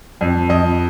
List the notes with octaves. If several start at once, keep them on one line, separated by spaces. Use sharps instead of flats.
F2
F2 D#5